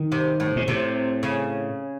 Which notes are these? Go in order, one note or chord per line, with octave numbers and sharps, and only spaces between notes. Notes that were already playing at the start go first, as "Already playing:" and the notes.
Already playing: D#3
C3
A2
G#2
A2 C3
C#3